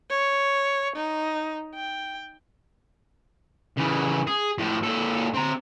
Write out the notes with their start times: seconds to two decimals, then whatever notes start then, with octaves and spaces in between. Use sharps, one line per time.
0.10 C#5
0.96 D#4
1.75 G5
3.77 C#3 E3
4.27 G#4
4.59 A2 F3
4.84 A#2 A4
5.34 C4 A#5